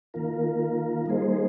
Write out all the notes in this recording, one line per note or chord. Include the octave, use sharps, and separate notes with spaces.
D#3 A#3 F4 A#4
G3 A#3 D#4 G#4 C5